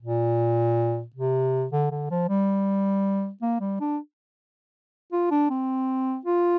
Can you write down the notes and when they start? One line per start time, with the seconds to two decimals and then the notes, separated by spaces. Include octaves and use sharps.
0.02 A#2
1.15 C3
1.72 D3
1.91 D3
2.11 F3
2.29 G3
3.42 A#3
3.60 G3
3.81 D4
5.12 F4
5.31 D4
5.50 C4
6.25 F4